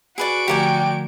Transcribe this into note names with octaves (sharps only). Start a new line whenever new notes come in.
F#4 G#4 B4 D5 D7
D3 F3 A3 G4 A#4 D5 G5 G#5